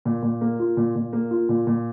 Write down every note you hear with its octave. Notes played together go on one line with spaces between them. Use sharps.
A#2
A#2
A#3
F4
A#2
A#2
A#3
F4
A#2
A#2